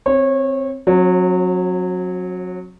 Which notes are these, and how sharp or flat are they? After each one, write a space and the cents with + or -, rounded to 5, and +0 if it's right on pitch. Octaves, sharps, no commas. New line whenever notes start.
C4 +0 C#5 -25
F#3 -20 C4 +45